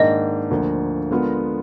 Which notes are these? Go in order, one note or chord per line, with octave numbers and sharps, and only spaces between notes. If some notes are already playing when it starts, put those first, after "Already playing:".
Already playing: G#2 D#3 A#3 D4 D#5
D2 D3 F3 A#3
D3 G#3 B3 F4 A#4